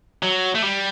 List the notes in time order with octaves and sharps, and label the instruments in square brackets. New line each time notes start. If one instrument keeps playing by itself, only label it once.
[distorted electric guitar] F#3
A3
G3